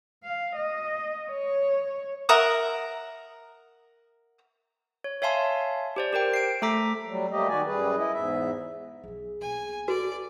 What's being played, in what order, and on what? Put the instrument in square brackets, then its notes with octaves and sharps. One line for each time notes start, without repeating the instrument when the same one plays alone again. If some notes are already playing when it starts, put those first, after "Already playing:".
[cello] F5
D#5
C#5
[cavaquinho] A#4 E5 F#5 D#6
[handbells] C#5
C#5 E5 F5 G#5 A5 C6
G4 C5 D5
G4 A#4 C5 G5
C7 D7
A3 A4 A#5 D6 B6
[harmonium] F#3 G3
G3 A3 A#3 G4 D#5
D#3 F#4 D5 G#5
F#2 G3 G#4 B4
E4 D#5
E2 G#2 E5
[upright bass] B1 F#3 [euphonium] G#4
[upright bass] B1 A#3 [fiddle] G#5
[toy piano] F#4 B4 [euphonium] A4 [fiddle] D5